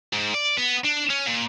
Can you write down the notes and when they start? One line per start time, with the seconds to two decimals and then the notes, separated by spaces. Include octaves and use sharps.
0.13 G#2
0.34 D5
0.58 B3
0.85 D4
1.10 C#4
1.27 A#2